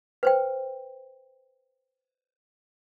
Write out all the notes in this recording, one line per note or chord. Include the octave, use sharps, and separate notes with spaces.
B4 C5 G5